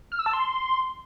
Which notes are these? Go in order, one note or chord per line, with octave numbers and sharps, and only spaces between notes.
F6
E6
A5
C6